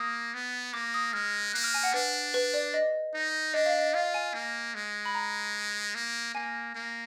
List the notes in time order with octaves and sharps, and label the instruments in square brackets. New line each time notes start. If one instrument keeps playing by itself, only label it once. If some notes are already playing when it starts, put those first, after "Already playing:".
Already playing: [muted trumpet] A#3 [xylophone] D#6
[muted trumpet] B3
[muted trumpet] A#3 [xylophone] D6
[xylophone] D#6
[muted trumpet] G#3 [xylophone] F6
[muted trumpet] A#3 [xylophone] F#6
[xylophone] F6
G#5
F#5
[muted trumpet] D4 [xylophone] B4
[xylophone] B4
D5
D#5
[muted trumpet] D#4
[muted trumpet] D4 [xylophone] D#5
[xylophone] F5
D#5
[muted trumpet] F4 [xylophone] F5
[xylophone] G#5
[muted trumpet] A#3
G#3
[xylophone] B5
A#5
[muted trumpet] A#3
[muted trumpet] A#3 [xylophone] G#5
[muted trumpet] A#3